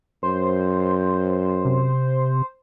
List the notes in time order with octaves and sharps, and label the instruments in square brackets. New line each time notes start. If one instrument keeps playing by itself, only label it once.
[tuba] F#2 [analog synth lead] C5
[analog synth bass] C3